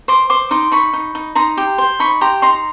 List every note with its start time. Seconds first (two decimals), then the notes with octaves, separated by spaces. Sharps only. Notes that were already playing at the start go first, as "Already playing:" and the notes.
0.08 C5 C6 D6
0.30 C5 C6 D6
0.51 D#4 C6 D6
0.71 D#4 B5 C#6
0.93 D#4
1.15 D#4
1.35 D#4 A#5 C6
1.57 G4
1.78 C5
1.99 D#4 B5 C#6
2.21 G4 A#5 C6
2.42 D#4 A#5 C6